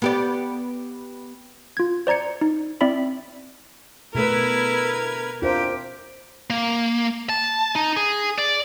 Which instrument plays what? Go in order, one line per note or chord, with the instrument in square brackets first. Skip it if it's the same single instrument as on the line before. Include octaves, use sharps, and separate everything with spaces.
[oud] B3 G4 D5
[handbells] F4 G#6
C5 D5 A#5 G#6 C#7
D#4
C4 E4 D5 E5 B5
[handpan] B2 [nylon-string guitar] D3 A3 B3 [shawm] E4 [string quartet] A#4 B4 G#6
[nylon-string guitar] C4 D4 E4 [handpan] F4 A#4 C5 [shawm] G4
[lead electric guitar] A#3
A5
D#4
G#4
D5